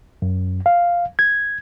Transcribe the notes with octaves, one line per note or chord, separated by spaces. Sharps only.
F#2
F5
G#6